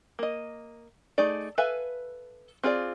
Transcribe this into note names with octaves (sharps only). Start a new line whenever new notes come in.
A#3 D#5
A3 D#4 G#4 D5
A4 B4 E5 F5 G#5
C4 F4 G#4 C5 D5